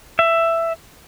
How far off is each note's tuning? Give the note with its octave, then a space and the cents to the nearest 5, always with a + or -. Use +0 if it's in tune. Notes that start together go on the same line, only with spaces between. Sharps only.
E5 +10